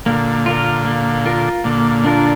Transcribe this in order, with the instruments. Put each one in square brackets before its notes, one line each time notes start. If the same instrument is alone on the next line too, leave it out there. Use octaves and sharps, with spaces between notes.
[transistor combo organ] A#2 D3 [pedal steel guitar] A#3
[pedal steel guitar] F4 A#4
A#3
F4 A#4
[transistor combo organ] A#2 D3 [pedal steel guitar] A#3
[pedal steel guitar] D4 F4 A#4